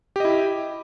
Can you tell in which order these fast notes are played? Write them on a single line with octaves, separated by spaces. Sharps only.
G4 D#5 E4